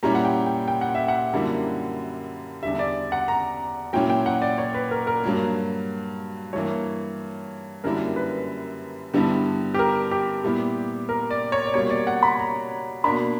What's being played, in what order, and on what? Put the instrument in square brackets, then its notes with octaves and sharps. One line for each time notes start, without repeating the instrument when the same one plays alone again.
[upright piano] A#2 G3 C#4 E4 [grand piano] A#5
[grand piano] F#5
G5
G5
G5
F#5
E5
F#5
[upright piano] F#2 D3 G3 A#3 E4
[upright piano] E2 D3 G3 [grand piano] E5
[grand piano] D5
F#5
A#5
[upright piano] A#2 F#3 C#4 E4 [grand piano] G5
[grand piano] G5
F#5
D5
C#5
B4
A#4
A#4
[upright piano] G2 F#3 A#3
[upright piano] G2 E3 A#3 [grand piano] C#5
[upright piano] F#2 D3 G3 A#3 E4 [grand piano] A#4
[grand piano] B4
[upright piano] G2 D3 G3 B3 E4
[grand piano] G4
A#4
G4
[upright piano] A#2 G3 B3 E4
[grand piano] A#4
D5
C#5
D5
[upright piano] B2 G3 A#3 [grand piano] C#5
[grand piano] D5
F#5
B5
A#5
[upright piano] B2 A#3 D4 [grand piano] B5